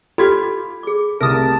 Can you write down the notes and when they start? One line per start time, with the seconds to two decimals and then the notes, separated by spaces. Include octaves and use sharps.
0.18 F4 G4 A4 B5 G#6 B6
0.83 G#4 D6
1.21 C2 A2 C3 A#4 A5 D#6